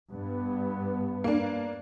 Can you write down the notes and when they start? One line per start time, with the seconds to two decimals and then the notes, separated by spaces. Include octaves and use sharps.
0.11 G2 B3
1.24 A#3 D4